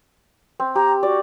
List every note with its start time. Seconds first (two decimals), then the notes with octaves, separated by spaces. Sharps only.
0.60 C4
0.75 G4 A#5
1.03 F#4 D5